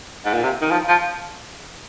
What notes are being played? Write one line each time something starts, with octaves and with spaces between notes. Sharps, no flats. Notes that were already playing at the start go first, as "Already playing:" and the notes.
G#2
A#2
C3
D#3
F3
F3